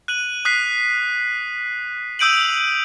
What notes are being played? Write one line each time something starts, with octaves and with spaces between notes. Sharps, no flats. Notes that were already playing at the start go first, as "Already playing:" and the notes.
F#6 D#7 F#7
D#6 F#6 B6 C7
D#6 E6 G6 D7 D#7 F#7